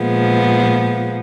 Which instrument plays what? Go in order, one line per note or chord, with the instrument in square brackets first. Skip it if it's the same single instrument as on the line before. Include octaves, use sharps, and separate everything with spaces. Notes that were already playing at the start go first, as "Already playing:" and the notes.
Already playing: [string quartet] A#2 F3 G#3 B3